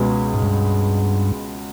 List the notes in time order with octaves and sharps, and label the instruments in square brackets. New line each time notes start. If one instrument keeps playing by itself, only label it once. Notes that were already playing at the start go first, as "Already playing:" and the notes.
Already playing: [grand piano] C#2 B2 G#3 B3
[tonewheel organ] G#2
G2